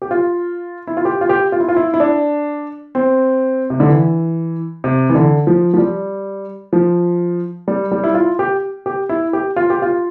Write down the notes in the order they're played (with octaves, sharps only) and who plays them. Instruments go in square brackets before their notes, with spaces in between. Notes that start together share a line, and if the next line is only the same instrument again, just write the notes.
[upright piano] G4
F4
E4
F4
G4
F4
G4
F4
E4
F4
E4
E4
D4
C4
C3
D3
E3
C3
E3
D3
F3
F3
G3
F3
G3
G3
E4
F4
G4
G4
E4
G4
F4
G4
F4